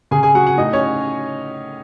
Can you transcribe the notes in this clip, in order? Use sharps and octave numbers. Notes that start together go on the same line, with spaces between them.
C#3 G#4 G#5
G#4 G#5
F#3 F#4 F#5
F#4 F#5
A2 D#4 D#5
C#4 C#5